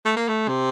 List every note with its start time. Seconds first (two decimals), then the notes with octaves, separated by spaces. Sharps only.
0.05 A3
0.16 A#3
0.28 A3
0.48 C3